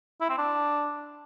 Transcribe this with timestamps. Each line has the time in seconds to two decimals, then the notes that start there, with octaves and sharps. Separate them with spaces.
0.21 E4
0.29 C4
0.38 D4